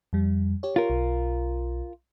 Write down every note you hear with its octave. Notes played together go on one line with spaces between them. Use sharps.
F2 G3
G4 C#5
F4 A#4
B1